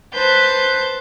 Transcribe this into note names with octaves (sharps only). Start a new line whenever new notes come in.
B4 C5 A5 G6